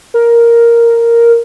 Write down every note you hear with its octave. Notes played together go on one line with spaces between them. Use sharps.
A#4